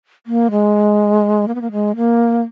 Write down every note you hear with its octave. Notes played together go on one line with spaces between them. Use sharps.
A#3
G#3
A#3
B3
A#3
G#3
A#3